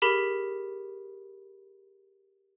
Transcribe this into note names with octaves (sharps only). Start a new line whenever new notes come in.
G4 G#4 A#4 B5 B6